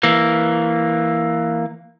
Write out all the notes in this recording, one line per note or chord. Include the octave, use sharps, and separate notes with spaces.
E3 A#3